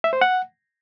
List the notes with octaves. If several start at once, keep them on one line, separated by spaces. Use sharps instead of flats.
E5
C5
F#5